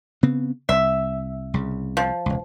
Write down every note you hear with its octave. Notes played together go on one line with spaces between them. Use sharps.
C#3 B3 C4
C2 E5
C2 C#3
F3
E1 C#2